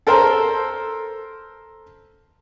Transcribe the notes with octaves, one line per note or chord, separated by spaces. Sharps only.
A4 A#4 C5